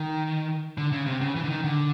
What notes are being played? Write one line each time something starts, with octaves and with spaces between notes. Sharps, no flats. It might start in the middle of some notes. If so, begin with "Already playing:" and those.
Already playing: D#3
D3
C#3
C3
C#3
E3
D3
D#3
D3